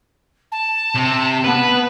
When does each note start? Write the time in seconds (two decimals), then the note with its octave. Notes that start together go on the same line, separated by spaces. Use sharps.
0.52 A5
0.95 C3
1.44 B3 B4